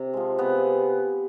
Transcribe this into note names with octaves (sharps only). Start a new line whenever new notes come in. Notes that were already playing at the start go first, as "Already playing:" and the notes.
Already playing: C3
F3 G#3
C3 B3 B4